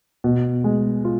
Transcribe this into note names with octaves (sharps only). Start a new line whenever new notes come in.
B2
G#3
F4